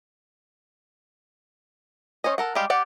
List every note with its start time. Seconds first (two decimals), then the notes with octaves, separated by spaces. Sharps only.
2.24 C#4 C5 C#5 D#5
2.38 A4 A#4 F#5
2.55 G3 G#3 G4 F5
2.70 G4 D5 F#5